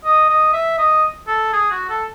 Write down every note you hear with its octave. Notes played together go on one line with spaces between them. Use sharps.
D#5
D#5
E5
D#5
A4
G#4
F#4
A4